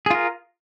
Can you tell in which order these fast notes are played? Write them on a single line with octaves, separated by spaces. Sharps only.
G#4 F4 A#4